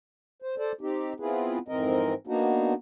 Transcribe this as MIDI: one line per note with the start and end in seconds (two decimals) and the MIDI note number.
0.42 0.55 72
0.58 0.72 69
0.58 0.72 72
0.58 0.72 74
0.81 1.13 60
0.81 1.13 63
0.81 1.13 67
1.20 1.58 59
1.20 1.58 60
1.20 1.58 64
1.20 1.58 65
1.20 1.58 68
1.20 1.58 71
1.68 2.14 41
1.68 2.14 44
1.68 2.14 52
1.68 2.14 60
1.68 2.14 70
1.68 2.14 75
2.27 2.74 58
2.27 2.74 59
2.27 2.74 62
2.27 2.74 63
2.27 2.74 66